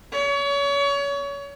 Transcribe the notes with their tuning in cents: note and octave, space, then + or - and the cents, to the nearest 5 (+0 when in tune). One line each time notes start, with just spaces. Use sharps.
C#5 +30